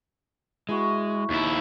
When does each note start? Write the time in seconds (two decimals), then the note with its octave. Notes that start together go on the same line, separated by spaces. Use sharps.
0.69 G#3 E4 F#4
1.30 D#2 E4